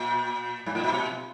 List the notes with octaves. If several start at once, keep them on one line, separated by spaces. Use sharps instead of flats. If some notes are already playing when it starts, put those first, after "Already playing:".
Already playing: A#2
G#2
A2
A#2
B2